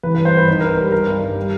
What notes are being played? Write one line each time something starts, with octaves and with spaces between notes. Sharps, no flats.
E3 B4
B4
G2
C5
G2 B4
D#3 C5
D#3 A#4
B4
G3
G3 A#4
G2
G2
G3